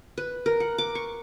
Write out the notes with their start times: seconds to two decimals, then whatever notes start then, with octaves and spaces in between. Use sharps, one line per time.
0.18 B4
0.46 A#4
0.60 F#5
0.78 D6
0.95 C#6